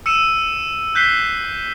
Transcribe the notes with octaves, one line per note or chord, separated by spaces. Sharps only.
E6 C#7 D#7 E7
F#6 G6 B6 C7 G7